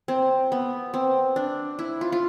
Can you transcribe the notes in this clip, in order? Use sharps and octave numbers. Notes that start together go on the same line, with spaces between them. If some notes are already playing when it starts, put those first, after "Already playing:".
C4
B3
C4
D4
E4
F4
F4